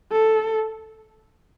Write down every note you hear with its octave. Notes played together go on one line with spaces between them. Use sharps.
A4